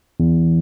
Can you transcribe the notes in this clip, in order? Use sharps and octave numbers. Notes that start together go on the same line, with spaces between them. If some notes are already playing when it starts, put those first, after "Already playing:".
E2